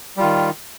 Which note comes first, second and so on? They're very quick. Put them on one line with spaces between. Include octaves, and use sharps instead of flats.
G3 F4 D#3